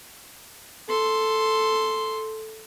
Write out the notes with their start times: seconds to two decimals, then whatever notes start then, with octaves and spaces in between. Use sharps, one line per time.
0.88 A4 C6